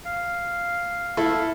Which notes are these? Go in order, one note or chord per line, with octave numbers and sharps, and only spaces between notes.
F5
E4 A4